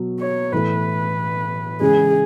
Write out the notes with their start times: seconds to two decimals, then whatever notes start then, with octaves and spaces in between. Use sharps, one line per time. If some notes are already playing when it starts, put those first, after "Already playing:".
Already playing: B2 F#3
0.21 C#5
0.53 A2 E3 A3 B4
1.81 C#3 E3 G#3 C#4 G#4